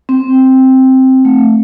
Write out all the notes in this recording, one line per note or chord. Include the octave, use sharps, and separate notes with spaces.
C4
A3